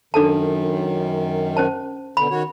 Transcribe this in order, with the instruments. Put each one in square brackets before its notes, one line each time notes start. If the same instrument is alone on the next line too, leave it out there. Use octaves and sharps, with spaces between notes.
[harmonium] F#2 D#3 [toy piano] D4 A4 A5
[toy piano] C#4 C5 A5
[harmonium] B2 D3 [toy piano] B5
[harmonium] D#3 F#4 C#5